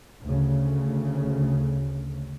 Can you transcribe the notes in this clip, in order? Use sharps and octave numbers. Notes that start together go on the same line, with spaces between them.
D2 C#3